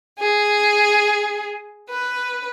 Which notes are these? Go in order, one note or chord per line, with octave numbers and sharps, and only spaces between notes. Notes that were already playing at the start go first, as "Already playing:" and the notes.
G#4
B4